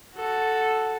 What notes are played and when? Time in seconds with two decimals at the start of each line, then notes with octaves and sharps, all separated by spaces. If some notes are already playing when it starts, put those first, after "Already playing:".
0.15 F#4 A4